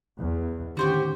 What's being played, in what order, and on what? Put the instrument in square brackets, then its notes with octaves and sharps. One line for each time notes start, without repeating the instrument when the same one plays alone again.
[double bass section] E2
[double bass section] A2 [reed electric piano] D3 D#3 C#4 [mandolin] F#4 C5 G5 [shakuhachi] G4